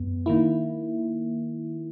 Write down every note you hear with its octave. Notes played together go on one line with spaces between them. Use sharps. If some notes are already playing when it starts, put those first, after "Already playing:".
Already playing: F#2 B3
D#3 A#3 E4